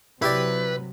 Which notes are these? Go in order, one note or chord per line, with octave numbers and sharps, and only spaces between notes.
C3 F#3 E4 G4 B4 D5